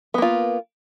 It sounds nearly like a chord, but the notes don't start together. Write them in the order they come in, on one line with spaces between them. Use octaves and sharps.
B3 A#3 F4